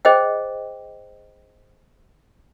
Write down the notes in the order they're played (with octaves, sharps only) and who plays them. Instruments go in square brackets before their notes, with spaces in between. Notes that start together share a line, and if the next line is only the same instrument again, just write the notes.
[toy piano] G#4 C5 D#5 G5